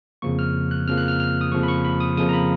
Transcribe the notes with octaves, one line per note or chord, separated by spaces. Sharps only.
F2 C#3 F3 A#3 C#6
F6
F#6
F2 C#3 F3 A#3 F6
F#6
F6
F6
D#6
F2 C#3 F3 A#3 C#6
B5
C#6
B5
D#6
F2 C#3 F3 A#3 D#6
A#5
B5